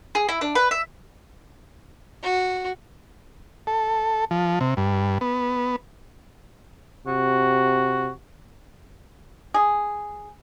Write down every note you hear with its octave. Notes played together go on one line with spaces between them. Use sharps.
G#4
E4
D4
B4
E5
F#4
A4
F3
C3
G2
B3
C3 F#4
G#4